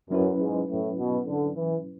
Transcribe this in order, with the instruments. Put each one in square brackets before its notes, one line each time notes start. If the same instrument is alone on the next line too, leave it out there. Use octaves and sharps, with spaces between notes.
[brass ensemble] F#2 [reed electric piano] F#3 C#4 E4 B4
[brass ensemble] G#2
A2
B2
D3
E3